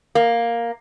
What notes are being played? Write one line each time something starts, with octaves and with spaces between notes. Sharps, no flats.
A#3